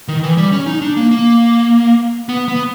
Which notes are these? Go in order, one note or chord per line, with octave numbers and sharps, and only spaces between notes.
D#3
E3
G3
C#4
D#4
D4
A#3
A#3
B3
B3